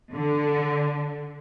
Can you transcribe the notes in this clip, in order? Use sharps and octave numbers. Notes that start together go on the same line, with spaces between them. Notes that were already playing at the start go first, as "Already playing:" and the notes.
D3